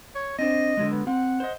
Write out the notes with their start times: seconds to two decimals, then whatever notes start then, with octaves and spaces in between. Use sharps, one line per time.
0.15 C#5
0.39 C4 D4 C5 D#5
0.77 D3 F#3 G#3
0.91 B3
1.07 C4 F#5
1.40 C5 D#5